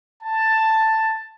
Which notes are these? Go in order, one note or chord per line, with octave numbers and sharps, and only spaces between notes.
A5